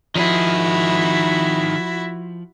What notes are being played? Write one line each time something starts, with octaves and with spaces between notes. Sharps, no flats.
D#3 F3 E4 F#4 G#4